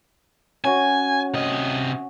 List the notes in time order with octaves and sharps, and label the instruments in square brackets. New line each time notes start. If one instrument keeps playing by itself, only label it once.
[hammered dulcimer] C#4 F#4 C#5 [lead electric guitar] G#5
[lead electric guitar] C3 D#5